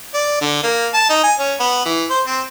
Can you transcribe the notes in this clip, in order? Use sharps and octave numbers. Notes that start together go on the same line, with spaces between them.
D5
D3
A#3
A5
D#4
G#5
C#4
B3
E3
C5
C4